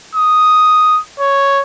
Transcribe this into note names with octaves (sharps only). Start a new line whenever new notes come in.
D#6
C#5